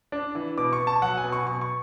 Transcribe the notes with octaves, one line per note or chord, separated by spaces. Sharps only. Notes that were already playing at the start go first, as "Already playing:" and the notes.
D4
E3
B2 D6
C#6
B2
A5
F#3 F#5
G#5
B2
C#6
B2 C#6
C#6